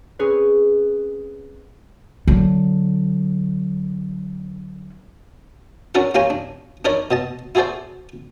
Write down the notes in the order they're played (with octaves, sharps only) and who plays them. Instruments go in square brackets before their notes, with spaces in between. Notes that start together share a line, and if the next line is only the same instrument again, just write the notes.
[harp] C4 C#4 G#4 B4
[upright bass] D3 F#3
[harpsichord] C#4 D4 F#4 A4 A#4 F#5
A#3 F4 G4 C#5 G#5 A#5
D4
D4 D#4 A#4 C#5 D5 B5
B2 D#5 A5
E4 F#4 G#4 A4 C5 D5